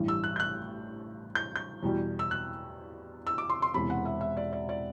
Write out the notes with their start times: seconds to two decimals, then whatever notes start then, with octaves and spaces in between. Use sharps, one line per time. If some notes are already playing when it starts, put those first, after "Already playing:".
Already playing: A1 G2 E3 G3
0.08 E6
0.24 F#6
0.36 G6
0.40 F#6
1.35 G6
1.56 G6
1.83 E2 B2 G3
2.19 E6
2.31 F#6
3.27 E6
3.38 D6
3.50 C6
3.62 C6
3.74 E1 E2 C3 B5
3.90 F#5
4.05 E5
4.21 E5
4.37 D5
4.53 D5
4.69 D5